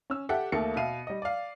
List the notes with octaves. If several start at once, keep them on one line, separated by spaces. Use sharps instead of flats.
C#4 E6
G4 A4 E5 F#5 G5
D#2 A3 A#3 A4 C#7
B2 E5 F5 D#7
G3 D#5
D5 F5